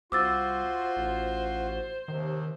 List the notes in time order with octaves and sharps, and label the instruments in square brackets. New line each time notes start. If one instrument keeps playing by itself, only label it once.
[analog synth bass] C2 [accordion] F4 F#4 [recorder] C5 [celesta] D6 E6 A6
[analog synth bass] A1
[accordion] D#2 C3 [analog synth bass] D#3